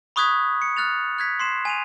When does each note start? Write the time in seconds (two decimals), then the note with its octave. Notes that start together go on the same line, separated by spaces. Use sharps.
0.16 B5 C#6 D#6 F#6 G#6 B6
0.62 C#7
0.77 F6 F#6 A6 F7
1.18 F#6 G#6 B6
1.39 C6 C7 E7
1.65 G#5 D#7 F7